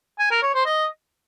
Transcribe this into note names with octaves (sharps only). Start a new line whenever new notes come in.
G#5
A#4
C#5
C5
D#5